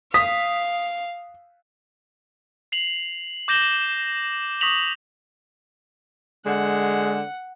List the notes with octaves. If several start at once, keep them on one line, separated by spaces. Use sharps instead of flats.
F5 D#6 B6
C7 F7 F#7
D6 G6 A#6 E7 F#7 G7
G6
C#6 D#6 A#6 B6 F7 F#7
D3 G#3 F#5